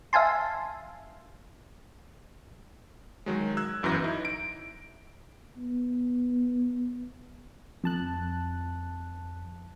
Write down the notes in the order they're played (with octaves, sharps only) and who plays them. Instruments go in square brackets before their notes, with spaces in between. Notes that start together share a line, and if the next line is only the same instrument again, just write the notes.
[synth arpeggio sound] E5 F5 G#5 A5 C6
[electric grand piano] D#3 F#3 G#3
E6 F#6 G#6
G1 F#2 E3 G6 A#6
D#4 E4
D7
[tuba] B3
[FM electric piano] F2 A5 F#6